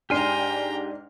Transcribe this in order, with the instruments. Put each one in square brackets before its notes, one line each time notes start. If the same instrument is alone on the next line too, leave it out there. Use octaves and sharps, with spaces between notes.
[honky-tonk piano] G#2 D4 F6 [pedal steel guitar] G4 G#5 C6 [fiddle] G5 A#5